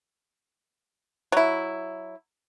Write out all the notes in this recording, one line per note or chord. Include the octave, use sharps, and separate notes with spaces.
F#3 E4